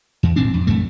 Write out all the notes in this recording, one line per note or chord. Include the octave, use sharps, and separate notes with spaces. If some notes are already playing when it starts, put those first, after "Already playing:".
E2
D#1 G#1 C4 D4
F2
A#1 F#2 A3